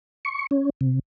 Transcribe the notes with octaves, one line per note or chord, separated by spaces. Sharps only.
C#6
C#4
C3